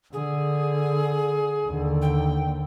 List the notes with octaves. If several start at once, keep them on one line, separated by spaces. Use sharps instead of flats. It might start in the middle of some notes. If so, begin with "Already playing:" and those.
D3 G#4
D#2 D3
G5